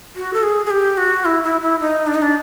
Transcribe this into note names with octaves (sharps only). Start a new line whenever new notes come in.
F#4
A4
G#4
G#4
G4
F#4
E4
E4
E4
D#4
D4
D#4
D4